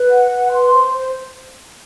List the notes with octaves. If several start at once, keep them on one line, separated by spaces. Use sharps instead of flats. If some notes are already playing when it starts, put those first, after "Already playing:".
Already playing: B4
F#5
B4
C6
C5
C5